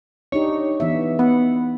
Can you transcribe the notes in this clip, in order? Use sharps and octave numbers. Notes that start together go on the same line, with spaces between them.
D4 D#4 G4 C#5
E3 B3 E5
B3 F#5